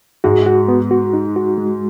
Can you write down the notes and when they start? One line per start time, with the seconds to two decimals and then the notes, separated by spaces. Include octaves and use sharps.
0.24 G#2 G#3 F#4
0.46 F#4
0.68 B3
0.91 F#4
1.14 D#4
1.36 F#4
1.58 G#3